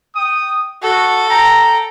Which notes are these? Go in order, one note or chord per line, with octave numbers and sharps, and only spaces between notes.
G5 D#6
F#4 A4
G5 A#5